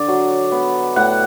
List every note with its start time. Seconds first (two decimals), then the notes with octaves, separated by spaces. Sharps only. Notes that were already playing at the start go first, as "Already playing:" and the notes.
Already playing: D3 D5
0.08 F#3
0.52 B3
0.96 A2 F#5